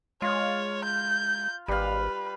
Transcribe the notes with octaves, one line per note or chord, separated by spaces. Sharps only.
G#3 F4 C#5 F5
G6
G#1 G3 B4 F5